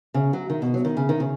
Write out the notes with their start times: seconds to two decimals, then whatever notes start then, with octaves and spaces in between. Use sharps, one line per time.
0.14 C#3
0.33 F#3
0.50 D#3
0.62 B2
0.74 F#3
0.85 D#3
0.97 C#3
1.09 D#3
1.20 C#3